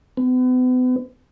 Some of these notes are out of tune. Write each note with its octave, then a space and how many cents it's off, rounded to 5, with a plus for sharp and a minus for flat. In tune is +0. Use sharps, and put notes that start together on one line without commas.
B3 +40